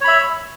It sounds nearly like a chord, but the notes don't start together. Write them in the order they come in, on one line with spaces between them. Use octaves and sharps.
C#5 B5 E5